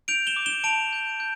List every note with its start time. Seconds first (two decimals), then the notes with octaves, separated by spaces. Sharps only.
0.08 G6 D7 F7
0.27 E7 G7
0.36 D6
0.46 E7 G7
0.64 A5 D7 F7
0.93 G6
1.20 G6